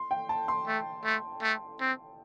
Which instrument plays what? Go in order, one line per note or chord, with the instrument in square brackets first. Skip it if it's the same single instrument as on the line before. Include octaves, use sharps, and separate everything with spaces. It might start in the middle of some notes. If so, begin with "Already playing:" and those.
Already playing: [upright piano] C6
G5
A5
C6
[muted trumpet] A3
A3
A3
C4